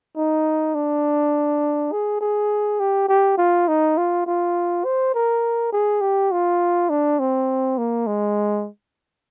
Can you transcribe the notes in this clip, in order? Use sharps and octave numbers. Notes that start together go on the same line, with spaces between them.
D#4
D4
G#4
G#4
G4
G4
F4
D#4
F4
F4
C5
A#4
G#4
G4
F4
D4
C4
A#3
G#3